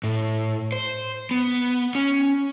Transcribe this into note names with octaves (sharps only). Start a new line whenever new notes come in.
A2
C5
B3
C#4